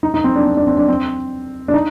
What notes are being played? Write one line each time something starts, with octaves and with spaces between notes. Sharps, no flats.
D#4
D#4
C4
D4
C4
D4
C4
D4
C4
D4
D#4